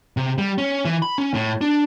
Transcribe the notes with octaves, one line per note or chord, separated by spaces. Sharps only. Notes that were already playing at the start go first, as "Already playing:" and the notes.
C3
G3
C#4
E3
B5
C#4
A2
D4